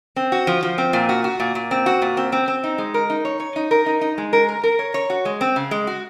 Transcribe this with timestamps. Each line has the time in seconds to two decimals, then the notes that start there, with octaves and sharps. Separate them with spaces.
0.16 C4
0.32 F#4
0.47 F3
0.63 F3
0.78 C4
0.93 A#2
1.09 F#4
1.24 F#4
1.40 A#2
1.55 A#2
1.71 C4
1.86 F#4
2.02 A#2
2.17 C4
2.32 C4
2.48 C4
2.64 D#4
2.78 G#3
2.94 A#4
3.10 D#4
3.25 C#5
3.40 C#5
3.56 D#4
3.71 A#4
3.86 D#4
4.01 D#4
4.18 G#3
4.33 A#4
4.49 A#4
4.64 A#4
4.79 C#5
4.94 C#5
5.10 F#4
5.25 G#3
5.41 C4
5.56 C#3
5.71 G#3
5.87 F#4